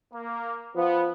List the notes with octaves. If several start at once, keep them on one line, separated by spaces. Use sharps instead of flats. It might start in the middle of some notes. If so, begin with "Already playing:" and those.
A#3
F3 B3